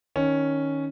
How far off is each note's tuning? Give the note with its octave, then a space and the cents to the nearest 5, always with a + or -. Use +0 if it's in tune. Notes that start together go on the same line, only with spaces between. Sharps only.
D#3 +0 C#4 +0